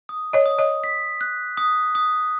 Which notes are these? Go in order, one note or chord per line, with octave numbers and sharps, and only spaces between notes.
D#6
C#5 D#5
D#6
C#5 D#5
B6
F#6
D#6
D#6